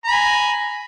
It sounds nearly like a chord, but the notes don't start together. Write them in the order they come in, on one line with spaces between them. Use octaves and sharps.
A#5 B5 G#5